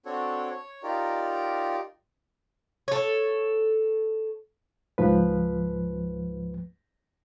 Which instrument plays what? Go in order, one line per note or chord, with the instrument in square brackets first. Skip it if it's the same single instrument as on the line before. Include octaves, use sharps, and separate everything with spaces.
[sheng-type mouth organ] C4 D4 F#4 A4 C#5
C#5
D#4 F4 G4 A#4 D5
[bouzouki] A4 C#5
[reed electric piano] C#2 G#2 F3 B4